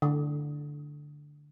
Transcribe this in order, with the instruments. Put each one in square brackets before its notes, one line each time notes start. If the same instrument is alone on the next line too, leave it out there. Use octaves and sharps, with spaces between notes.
[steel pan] D3